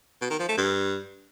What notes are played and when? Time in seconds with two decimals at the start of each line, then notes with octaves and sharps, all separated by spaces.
0.21 B2
0.30 D#3
0.39 F3
0.48 A3
0.57 G2